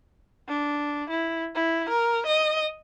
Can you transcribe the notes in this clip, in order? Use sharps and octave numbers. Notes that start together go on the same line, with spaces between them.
D4
E4
E4
A#4
D#5